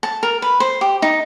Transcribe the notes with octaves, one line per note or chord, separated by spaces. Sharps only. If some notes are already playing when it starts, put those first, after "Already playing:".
A5
A#4
B4
C5
G4
D#4